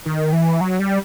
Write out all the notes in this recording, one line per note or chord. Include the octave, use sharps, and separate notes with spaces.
D#3
E3
F#3
G3